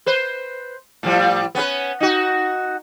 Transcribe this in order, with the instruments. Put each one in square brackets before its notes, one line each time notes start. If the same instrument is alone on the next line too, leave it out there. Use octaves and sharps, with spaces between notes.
[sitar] B4 C5
A2 F3 G3
B3 C#4 B4
D#4 F#4